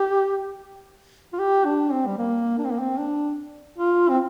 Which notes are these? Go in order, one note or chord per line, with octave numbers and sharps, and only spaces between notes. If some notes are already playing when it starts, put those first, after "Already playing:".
Already playing: G4
F4
G4
D4
C4
G3
A#3
D4
C4
A#3
C4
D4
F4
C4